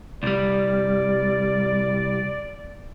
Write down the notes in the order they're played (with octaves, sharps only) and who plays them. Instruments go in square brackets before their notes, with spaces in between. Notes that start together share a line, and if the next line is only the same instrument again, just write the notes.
[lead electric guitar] C2 G3 [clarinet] D5